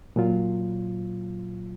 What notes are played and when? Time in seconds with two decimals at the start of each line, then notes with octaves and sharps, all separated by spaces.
0.16 A#2 F#3 F4